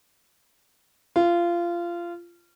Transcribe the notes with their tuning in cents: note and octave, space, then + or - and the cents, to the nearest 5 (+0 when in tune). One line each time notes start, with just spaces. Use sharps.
F4 -20